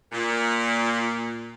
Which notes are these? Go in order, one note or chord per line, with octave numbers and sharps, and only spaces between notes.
A#2